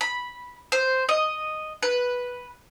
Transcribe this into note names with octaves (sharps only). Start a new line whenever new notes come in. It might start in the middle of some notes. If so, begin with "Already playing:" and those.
B5
C5
D#5
B4